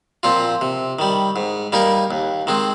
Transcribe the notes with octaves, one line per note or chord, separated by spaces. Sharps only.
A#2 F3 C4 F4
C3
D#3 G3
G#2
G3 A#3 D#4 A#4
D#2
D#3 G#3 C4